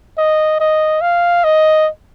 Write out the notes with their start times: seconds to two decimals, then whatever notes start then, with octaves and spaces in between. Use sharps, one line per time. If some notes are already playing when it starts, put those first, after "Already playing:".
0.18 D#5
0.60 D#5
1.01 F5
1.44 D#5